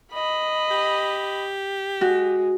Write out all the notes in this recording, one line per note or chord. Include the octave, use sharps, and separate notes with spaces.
D#5 B5
G4
G#3 F#4